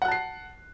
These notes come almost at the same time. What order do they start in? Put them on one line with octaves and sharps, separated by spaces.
F#5 F#6 A5 C7